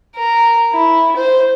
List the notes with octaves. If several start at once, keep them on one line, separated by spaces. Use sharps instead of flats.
A#4
E4
C5